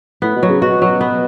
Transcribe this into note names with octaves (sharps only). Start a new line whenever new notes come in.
A2 B3
B2
F#3
C#3
B2 F#4
F#3
B3